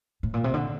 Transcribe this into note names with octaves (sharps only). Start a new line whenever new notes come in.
A2
A#2
C3
D3